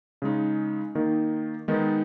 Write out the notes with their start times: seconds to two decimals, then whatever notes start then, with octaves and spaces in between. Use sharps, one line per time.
0.22 C#3 G#3 D#4
0.95 D#3 A#3 D#4
1.68 D#3 G#3 B3 D#4